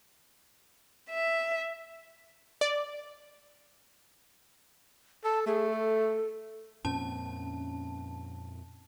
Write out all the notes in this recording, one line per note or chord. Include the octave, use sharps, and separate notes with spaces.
E5
D5
A4 A5
A3 G#4
A4
F2 A#2 C4 C#4 A5